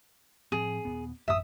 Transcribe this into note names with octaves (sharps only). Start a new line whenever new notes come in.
A2 F3 C4 G#4
D#1 F#2 B3
A1 F#2 E5 D#6